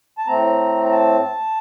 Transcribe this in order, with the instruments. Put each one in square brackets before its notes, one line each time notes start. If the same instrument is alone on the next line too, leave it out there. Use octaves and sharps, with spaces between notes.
[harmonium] A5
A2 A3 C4 A#5
A#5
A5